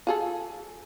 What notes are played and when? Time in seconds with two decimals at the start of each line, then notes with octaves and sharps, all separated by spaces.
0.07 F4 G#4 A4